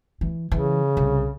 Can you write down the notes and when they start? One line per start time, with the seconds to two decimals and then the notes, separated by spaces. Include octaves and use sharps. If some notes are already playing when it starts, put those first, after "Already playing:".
0.21 E3
0.51 C#3 E3
0.97 C2